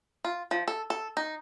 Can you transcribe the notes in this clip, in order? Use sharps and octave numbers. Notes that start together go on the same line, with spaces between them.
F4
F3
A4
A4
D#4